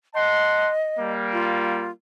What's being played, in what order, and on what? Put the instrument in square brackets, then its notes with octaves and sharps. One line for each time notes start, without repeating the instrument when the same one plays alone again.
[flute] D#5 [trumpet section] F#5 A5 C6
[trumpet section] G3 A#3
[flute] F4